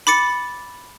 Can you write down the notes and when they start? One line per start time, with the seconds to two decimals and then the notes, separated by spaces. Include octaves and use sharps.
0.07 B5 D6 A6 C#7